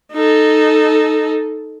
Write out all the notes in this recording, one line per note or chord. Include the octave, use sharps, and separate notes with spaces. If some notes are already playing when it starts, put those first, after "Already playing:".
D#4 A4